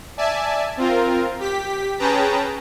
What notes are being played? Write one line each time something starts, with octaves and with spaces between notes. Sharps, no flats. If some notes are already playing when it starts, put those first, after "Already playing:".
D5 E5 G#5 A5
C4 F4 A#4
G4 B6
C#4 G#4 B4 G5 A5 A#5